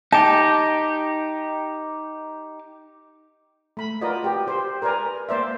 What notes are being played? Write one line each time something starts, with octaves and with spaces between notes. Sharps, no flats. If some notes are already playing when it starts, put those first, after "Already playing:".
D#4 G4 A5
A3 B5
F4 F#4 A#4 B4 D5 D#5
F#4 G4
G4 C5
A#4 B4 D5 G#5 A#5
A#3 C5 D5 E5